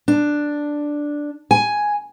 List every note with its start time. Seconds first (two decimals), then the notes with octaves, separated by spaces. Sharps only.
0.08 D4
1.51 G#5